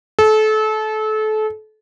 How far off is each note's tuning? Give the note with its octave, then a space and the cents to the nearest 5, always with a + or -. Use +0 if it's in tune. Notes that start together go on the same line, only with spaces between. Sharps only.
A4 -30